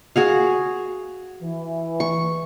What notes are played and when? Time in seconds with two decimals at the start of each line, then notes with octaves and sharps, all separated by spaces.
0.16 F#4 G#4 F5
1.42 E3
2.00 C#6